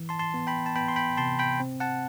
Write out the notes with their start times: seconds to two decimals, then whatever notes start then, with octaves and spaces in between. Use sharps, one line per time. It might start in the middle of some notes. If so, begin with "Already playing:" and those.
Already playing: E3
0.09 A5 C6
0.19 A5 C6
0.34 B3
0.47 G5 B5
0.66 A5
0.76 B3 G5 B5
0.88 C6
0.96 G5 B5
1.17 C3 A5 C6
1.39 G5 B5
1.60 C4
1.80 F#5 A5